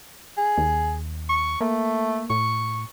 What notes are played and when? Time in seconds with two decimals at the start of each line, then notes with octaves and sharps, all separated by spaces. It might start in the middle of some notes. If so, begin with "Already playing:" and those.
0.37 G#4
0.58 D#2
1.29 C#6
1.61 A3 A#3
2.30 A2 C#6